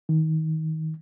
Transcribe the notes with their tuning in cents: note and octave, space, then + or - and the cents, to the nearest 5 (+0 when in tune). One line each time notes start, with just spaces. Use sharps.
D#3 +25